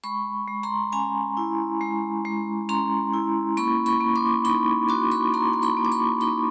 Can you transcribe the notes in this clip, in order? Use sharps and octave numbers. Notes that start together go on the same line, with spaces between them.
G#3 B5 C#6
G#3
A#5 C6
C#4 G#5 A#5
E4
G#3
G#3
C#4 A#5 C6
E4
A#3 B5 C#6
B5 C#6
A#3
C6 D6
D#4 B5 C#6
F#4 C6 D6
B5 C#6
A#3 A#5 C6
C6
B5 C#6
A#3
D6
B5 C#6
D#4 B5 C#6